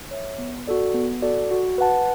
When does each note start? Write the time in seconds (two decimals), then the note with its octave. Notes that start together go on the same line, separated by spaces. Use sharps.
0.11 C#5 E5
0.38 B3
0.67 F#4 A4 D5
0.94 B3
1.22 F#4 A4 D5
1.51 F#4
1.78 B4 F#5 A5